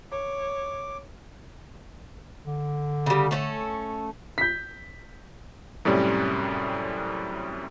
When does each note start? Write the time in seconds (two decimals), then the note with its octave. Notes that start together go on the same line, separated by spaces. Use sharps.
0.12 C#5 D6
2.47 D3
3.06 C#3 G3
3.31 A3 C#4 A4
4.38 G6 B6
5.85 F#2 A2 C3 G3 C#4